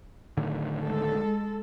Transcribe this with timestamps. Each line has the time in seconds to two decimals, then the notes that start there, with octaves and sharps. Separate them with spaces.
0.37 A2 D3 D#3
0.84 G#3 A4